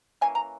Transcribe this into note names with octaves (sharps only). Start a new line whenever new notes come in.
E3 A#3 C#4 G#5
A#5